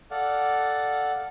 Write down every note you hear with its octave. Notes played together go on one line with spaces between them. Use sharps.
A4 D5 F5 F#5